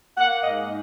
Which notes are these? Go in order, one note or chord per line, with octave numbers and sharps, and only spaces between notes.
A#3 F#5
G#2 D#5
D#4